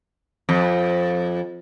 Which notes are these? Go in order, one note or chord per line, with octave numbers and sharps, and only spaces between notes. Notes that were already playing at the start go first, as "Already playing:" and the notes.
F2